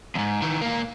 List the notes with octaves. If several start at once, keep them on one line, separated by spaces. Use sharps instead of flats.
E2 G#2
D#3 E3
A#2 A#3